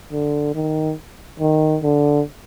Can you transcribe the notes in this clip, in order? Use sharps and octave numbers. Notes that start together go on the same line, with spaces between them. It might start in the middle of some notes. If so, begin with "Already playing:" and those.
D3
D#3
D#3
D3